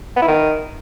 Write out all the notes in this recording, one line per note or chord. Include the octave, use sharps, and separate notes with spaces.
B3
E4
D#3